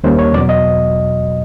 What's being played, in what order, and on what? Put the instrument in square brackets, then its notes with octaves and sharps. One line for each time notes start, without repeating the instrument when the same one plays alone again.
[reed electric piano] D#2 D#3 G3 A#3 C#4 C5
C#5
E2 B2 F#3 D5
D#5